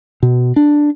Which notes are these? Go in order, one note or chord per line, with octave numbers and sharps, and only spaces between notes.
B2
D4